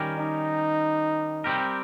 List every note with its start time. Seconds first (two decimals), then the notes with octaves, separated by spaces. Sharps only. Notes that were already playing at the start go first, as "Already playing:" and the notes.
Already playing: D#3 G3 C#4 G4 A#4
0.18 D#4
1.44 G3 C4 G4 A#4